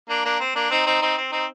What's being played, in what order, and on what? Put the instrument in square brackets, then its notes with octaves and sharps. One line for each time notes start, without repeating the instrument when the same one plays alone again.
[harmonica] A#3 D4
A#3 D4
C4
A#3 D4
C4 D#4
C4 D#4
C4 D#4
C4
C4 D#4